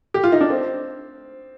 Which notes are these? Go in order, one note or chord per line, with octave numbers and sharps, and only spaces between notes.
G4
F4
D#4
D4
C4